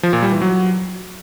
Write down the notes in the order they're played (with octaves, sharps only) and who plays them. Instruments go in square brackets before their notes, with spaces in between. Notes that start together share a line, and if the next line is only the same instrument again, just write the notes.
[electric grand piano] F3
A#2
G3
E3
F#3